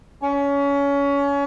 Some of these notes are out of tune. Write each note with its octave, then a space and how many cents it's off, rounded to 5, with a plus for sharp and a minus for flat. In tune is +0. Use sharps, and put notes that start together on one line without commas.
C#4 +25